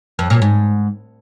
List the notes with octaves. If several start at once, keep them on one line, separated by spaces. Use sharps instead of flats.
F2
A#2
G#2